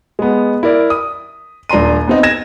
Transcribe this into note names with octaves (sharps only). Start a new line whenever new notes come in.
G#3 B3
E4 A#4 D5
D#6
D#1 D4 A#5 C6 D#7
B3 C4 D#4
G#6 A#6 E7